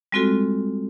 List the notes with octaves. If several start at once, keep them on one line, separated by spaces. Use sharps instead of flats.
G3 G#3 C4 F4 F#4 A4